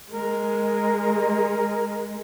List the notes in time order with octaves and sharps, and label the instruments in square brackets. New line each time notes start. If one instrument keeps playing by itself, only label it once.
[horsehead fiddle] G#3 [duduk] A#4